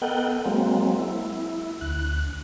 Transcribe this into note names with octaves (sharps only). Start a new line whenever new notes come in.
B3 A4 A#4 D#5 F#5 G5
F#3 G#3 A#3 C4
E4
D2 F#6